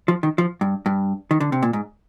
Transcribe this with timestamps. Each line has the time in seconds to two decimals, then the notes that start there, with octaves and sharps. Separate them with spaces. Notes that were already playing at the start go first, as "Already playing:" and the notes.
0.08 F3
0.23 D#3
0.38 F3
0.61 G2
0.86 G2
1.31 D#3
1.40 D3
1.52 C3
1.62 A#2
1.73 G#2